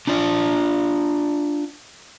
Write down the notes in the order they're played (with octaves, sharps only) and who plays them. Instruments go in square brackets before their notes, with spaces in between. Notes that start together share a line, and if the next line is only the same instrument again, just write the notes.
[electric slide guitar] D4 F4 D5